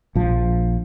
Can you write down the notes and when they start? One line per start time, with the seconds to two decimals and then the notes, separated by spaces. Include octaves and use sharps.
0.15 A#1 F3